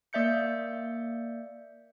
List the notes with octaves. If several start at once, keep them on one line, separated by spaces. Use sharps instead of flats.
A#3 D5 E5 G6 C#7